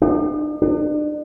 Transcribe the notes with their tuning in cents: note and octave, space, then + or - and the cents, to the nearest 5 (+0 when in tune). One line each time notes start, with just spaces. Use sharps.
D4 +45
D4 +40